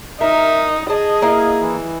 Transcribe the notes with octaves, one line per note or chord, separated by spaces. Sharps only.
D#4 A#4 E5
G#4 D#5 A5
A#3 E4 F5
E3